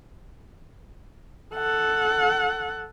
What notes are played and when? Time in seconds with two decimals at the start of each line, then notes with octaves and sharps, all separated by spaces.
1.55 A4 F#5